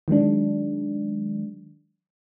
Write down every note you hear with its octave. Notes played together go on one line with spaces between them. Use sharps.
D#3 F#3 G#3 D4